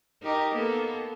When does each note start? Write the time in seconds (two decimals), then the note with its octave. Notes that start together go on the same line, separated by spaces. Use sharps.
0.23 D#4 G4 A#4
0.54 A#3 B3 A4